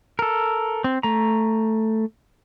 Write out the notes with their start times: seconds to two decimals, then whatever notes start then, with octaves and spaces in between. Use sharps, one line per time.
0.19 A4 A#4
0.84 C4
1.03 A3 A#5